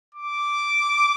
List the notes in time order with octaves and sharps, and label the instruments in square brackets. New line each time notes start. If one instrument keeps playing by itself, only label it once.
[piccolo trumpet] D6